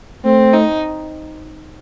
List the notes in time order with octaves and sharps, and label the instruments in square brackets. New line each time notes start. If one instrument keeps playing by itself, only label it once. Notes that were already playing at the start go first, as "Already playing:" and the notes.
[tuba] A3 [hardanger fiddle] C4
[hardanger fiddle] D#4